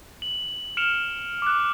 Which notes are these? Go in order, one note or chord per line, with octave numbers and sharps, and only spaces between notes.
F#7
F6 C#7 D7 E7 F7
D6 F#6